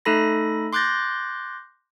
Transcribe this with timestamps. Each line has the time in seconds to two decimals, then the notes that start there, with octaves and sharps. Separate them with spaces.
0.05 A3 D#4 A4 B5 A#6
0.73 C6 D6 F#6 G6 A6 A#6